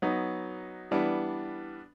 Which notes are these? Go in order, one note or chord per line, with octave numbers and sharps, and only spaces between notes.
F#3 B3 D#4
E3 G3 B3 D4